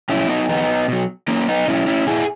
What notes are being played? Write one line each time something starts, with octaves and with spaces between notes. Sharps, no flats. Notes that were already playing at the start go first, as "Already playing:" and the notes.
B2 F#3 C#4 E4
B3 D#4
E2 B3 D#4
B2 F#3
E2 A#3 C#4
B3 D#4
B2 F#3 C#4 E4
C#4 E4
A#2 E4 G#4